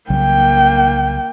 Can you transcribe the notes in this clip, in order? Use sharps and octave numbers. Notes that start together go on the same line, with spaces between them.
C2 C#3 F#3 A#3 G5